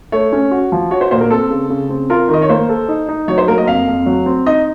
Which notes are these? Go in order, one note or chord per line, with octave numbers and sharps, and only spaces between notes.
A3 C#5
C#4
F#4
F3
F#4 C#5
C5
A#2 C5
A#4
C4 A4
C#3
C#3
C4
F4 A#4
D#3 D#5
C#5
A#3 C5
A4
D#4
D#4
F#3 C#5
C5
A#3 A#4
D#5
F2 F5
F2
F#3
C4
D#4 D#5